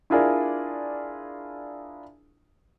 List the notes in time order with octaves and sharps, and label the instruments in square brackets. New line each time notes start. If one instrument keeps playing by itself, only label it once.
[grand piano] D4 E4 F4 G#4 A#4 D5